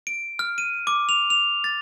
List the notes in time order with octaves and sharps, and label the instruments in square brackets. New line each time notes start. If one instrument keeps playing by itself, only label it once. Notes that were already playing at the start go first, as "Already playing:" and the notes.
[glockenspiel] D7
F6
D#7
D6
F7
F7
A6